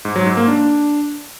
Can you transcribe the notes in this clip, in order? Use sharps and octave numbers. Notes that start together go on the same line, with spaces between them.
G#2
F#3
G#2
A#3
D4